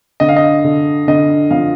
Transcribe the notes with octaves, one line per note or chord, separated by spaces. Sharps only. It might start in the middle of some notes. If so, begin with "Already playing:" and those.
D3 D#5
F5
D#5
D3
D3 D#5
F3 F5